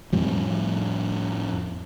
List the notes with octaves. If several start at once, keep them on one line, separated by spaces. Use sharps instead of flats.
F2 A2 F3 G3